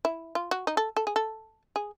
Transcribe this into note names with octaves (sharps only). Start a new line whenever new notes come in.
E4
F4
F#4
D#4
A4
A4
G#4
A4
G#4